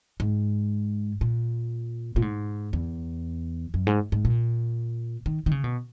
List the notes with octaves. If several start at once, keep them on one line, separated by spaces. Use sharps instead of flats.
G#2
A#2
A#2
G#2
E2
F#2
G#2
G#2
A#2
D#3
D#3
C#3
B2